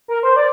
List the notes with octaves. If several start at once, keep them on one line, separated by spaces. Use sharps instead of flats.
A#4
C5
D5